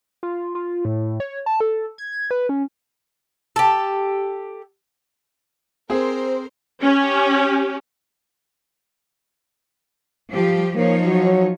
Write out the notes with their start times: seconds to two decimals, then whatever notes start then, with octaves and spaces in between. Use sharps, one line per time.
0.23 F4
0.55 F4
0.85 A2
1.20 C#5
1.46 A5
1.60 A4
1.98 G#6
2.31 B4
2.49 C#4
3.56 G4 A4
5.90 C4 G#4 A#4 C5
6.83 C#4 G4
10.32 F3 G3 G4
10.76 F3 A#3 D#4 C#5
11.05 F#3